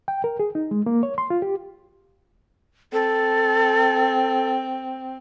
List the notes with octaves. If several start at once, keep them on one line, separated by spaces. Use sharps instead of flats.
G5
A#4
G#4
D#4
G#3
A#3
C#5
C6
F4
G4
C4 A4